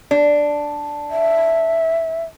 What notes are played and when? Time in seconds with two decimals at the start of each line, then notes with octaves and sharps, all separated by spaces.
0.11 D4
1.10 E5